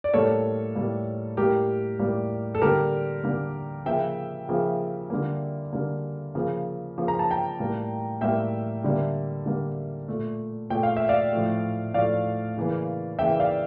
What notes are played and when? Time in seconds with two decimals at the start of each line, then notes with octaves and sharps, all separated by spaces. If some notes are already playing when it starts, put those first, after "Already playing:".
0.04 D5
0.13 A2 G3 A#3 A4 C#5
0.75 A2 G3 A#3
1.37 A2 G3 A#3 G4 A#4
1.99 A2 G3 A#3
2.55 A4
2.62 D3 G3 A#3 G4 A#4
3.24 D3 G3 A#3
3.86 C#3 F3 A#3 E5 G5
4.49 C#3 F3 A#3
5.10 D3 G3 A#3
5.73 D3 G3 A#3
6.35 C#3 F3 A#3
6.98 C#3 F3 A#3
7.08 A#5
7.19 A5
7.31 G5 A#5
7.60 A2 G3 A#3
8.21 A2 G3 A#3 E5 G5
8.84 D3 G3 A#3
9.46 D3 G3 A#3
10.08 A#2 A3
10.70 A#2 A3 G5
10.83 F5
10.97 E5
11.09 D5 F5
11.33 A2 F3 A3
11.94 A2 F3 A3 D5 F5
12.57 C#3 E3 A#3
13.19 C#3 E3 A#3 E5 G5
13.40 D5 F5